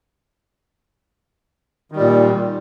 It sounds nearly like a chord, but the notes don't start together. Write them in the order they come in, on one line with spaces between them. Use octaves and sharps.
D#3 G3 A#2